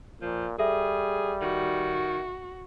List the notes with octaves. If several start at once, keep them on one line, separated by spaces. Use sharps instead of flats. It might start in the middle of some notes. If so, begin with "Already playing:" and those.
A#2 F3
G3 G#4 A4 E5
D#3 F#4